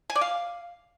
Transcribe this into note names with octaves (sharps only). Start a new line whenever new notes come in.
G#5
D5
F5